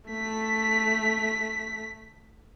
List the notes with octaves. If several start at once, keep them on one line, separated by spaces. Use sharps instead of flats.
A3 B6